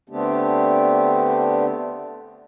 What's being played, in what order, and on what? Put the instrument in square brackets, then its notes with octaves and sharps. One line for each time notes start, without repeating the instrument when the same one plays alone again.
[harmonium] D3 A3 B3 C4 D4 G4